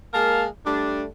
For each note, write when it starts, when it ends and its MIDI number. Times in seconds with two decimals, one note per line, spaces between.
0.13 0.46 56
0.13 0.46 58
0.13 0.46 70
0.13 0.46 77
0.13 0.46 81
0.66 1.05 55
0.66 1.05 57
0.66 1.05 62